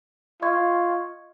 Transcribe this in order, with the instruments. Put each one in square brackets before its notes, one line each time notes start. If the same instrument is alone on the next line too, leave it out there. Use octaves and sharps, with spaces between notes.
[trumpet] F4 [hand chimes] D#5 C#6 G#6